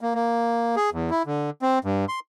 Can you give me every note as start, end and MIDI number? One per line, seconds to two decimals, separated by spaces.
0.01 0.14 58
0.15 0.75 58
0.76 0.90 68
0.93 1.10 40
1.11 1.23 64
1.26 1.50 50
1.62 1.79 60
1.84 2.05 43
2.09 2.20 84